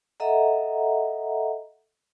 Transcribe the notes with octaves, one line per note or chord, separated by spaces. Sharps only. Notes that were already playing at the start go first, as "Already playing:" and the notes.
A4 D#5 E5 F#5 A#5